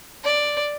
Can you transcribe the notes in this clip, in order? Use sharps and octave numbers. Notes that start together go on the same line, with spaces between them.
D5